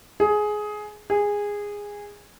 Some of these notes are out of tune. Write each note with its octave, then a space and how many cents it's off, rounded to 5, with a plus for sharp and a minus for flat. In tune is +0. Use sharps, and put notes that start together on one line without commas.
G#4 +15
G#4 -15